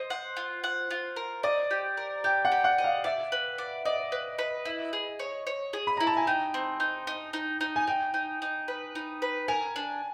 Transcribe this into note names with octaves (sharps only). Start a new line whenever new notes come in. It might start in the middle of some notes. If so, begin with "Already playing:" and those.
Already playing: C5 D#5
F#5
F4
F#5
F4
A#4
D5 D#5
G4
A#4
G4 G5
F#5
G4
F#5
D#5
F5
D5 E5
B4
D5
D5 D#5
B4
B4
E4
G#4
C#5
C#5
G#4
B5
E4 A#5
A5
G#5
D#4 G5
C4
D#4
D#4
D#4
D#4
G#5
D#4 G5
D#4
D#4
B4
D#4
B4
A#4 G#5
D4